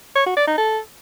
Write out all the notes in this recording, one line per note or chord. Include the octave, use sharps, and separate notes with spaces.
C#5
F#4
D5
D#4
A4